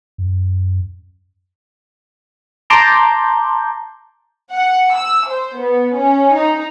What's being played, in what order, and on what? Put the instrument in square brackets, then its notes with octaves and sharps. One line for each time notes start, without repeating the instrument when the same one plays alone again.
[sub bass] F#2
[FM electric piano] A5 A#5 C6 D6 G6
[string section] F#5
E6
C5
B3
C#4
D#4